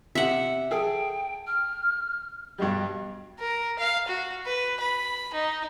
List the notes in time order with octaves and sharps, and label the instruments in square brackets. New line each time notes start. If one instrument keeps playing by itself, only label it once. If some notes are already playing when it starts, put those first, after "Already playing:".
[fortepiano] C3 [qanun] E5 F#5
[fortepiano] G#4 A4 [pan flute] G5
[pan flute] F6
[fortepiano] G2 B2 G3 [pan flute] D#5
[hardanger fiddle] A#4
F5
F#4
B4
B5
D#4